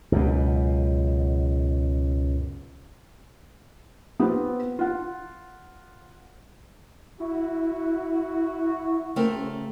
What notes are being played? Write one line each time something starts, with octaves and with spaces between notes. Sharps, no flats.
C#2 F#2 B2
B3 C4 F4 G4 B4 C5
F4 F#5
E4 F#4
C#3 A3 C4 A#4